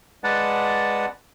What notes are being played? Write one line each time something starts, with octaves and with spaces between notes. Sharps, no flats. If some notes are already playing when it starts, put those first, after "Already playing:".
G#3 B4 D5 F#5 A5